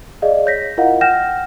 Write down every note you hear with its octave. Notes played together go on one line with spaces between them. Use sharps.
G#4 D5 D#5 F5
C#5 G6 A#6 B6
E4 F4 A#4 D#5 F5 F#5
F#5 G5 F6 G6 A#6 E7